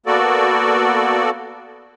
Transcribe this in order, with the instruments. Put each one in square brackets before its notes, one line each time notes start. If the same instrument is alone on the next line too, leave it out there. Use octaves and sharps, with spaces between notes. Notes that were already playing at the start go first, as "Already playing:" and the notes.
[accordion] A#3 B3 F#4 A4 D5